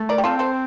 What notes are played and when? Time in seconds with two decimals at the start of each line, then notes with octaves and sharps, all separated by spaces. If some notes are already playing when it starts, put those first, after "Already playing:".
Already playing: A3
0.09 A#4 D5
0.18 G4
0.24 C4 F4 A4
0.39 A4 C5